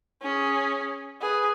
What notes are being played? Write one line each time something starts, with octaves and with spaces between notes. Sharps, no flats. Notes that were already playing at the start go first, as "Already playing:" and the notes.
C#4 G#4
G#4 B4